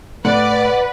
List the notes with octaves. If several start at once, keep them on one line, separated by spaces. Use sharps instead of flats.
A2 B4 D5 F#5